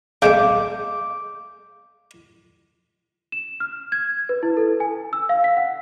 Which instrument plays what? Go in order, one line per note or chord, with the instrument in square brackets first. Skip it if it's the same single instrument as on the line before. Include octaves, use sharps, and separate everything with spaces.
[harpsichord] C#3 G#3 A3 [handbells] F5 G6 [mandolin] D6
[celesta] E7
F6
G#6
B4
E4
A4
G#5
E6
F5
B6
F#5